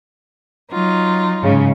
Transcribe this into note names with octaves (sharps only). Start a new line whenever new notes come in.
F#3 D#4 F4
G#2 C#3